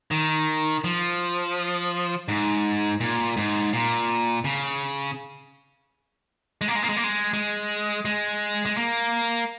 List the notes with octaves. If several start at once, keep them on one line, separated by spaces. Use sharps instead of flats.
D#3
F3
G#2
A#2
G#2
A#2
C#3
G#3
A#3
G#3
A#3
G#3
A#3
G#3
G#3
G#3
G#3
A#3